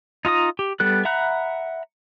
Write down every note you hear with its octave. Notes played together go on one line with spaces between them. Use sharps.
D#4 F4 A#5 D#6
G4
G3 B3 A4 F#6
E5 F#5 A#5 B5 F#6